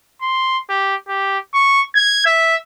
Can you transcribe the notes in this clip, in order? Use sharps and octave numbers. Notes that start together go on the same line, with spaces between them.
C6
G4
G4
C#6
G#6
E5